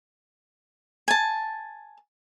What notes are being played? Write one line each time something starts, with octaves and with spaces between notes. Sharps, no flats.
G#5 A5